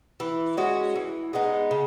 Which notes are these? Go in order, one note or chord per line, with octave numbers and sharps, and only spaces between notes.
E3
G#3 C#4 F#4
E3
G#3 B3 D#4
C#3